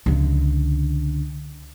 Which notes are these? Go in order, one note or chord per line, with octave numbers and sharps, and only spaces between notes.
C#2 D3